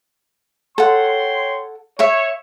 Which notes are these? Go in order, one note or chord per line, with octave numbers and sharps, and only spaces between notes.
A4 C#5 F#5 G5 C6
C#5 E5 C#6